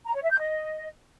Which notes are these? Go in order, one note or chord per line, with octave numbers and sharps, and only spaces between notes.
A#5
C#5
E5
G6
D#5